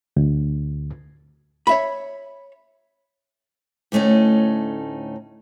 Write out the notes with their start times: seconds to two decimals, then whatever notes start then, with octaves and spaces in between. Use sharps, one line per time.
0.17 D2
1.67 C#5 E5 B5
3.92 D2 A2 A3 C#4 D#4